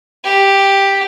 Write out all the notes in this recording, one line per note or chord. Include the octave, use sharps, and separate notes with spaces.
G4